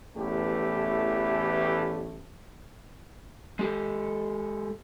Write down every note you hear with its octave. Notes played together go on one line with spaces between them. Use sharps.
A1 E2 E3 A3 G4
G#3 G4 A4